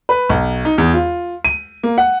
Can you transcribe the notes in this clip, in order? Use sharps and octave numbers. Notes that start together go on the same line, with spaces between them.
B4
B1
D#4
E2
F4
D#7
A#3
F#5